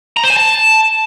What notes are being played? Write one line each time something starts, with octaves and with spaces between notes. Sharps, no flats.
A#5
C5
G#5
A5